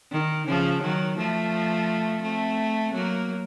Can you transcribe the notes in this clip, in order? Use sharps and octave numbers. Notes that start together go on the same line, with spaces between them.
D#3
C#3 F3
D#3 F#3
F3 A3
A3 C4
F#3 A#3